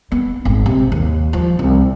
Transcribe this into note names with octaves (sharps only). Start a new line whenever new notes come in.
B3
G#1
C3
D#2
F3
C2